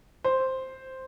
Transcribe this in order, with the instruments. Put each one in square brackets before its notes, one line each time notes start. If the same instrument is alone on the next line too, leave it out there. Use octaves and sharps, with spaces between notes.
[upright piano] C5